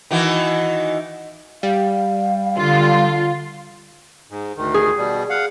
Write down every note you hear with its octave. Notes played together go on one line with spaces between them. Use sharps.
D#3 E3 F#4
G3 F5
D3 F4
G#2
D2 D#3
G#4
B2 G3
F5 F#5